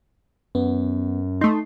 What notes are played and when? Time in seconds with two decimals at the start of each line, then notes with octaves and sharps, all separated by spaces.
0.55 F#2 B3
1.41 A3 D#4 C6